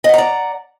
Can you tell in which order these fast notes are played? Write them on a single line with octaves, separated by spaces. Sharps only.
D#5 F#5 A#5 D5